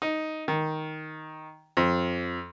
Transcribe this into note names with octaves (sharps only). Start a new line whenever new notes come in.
D#4
D#3
F2